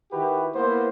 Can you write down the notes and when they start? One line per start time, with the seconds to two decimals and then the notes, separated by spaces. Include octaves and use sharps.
0.12 D#3 E4 F#4 G4 B4
0.55 A#3 B3 E4 C5